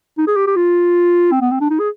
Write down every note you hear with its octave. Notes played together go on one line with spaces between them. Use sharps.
D#4
G#4
G4
G4
F4
C4
B3
C4
D4
D#4
G#4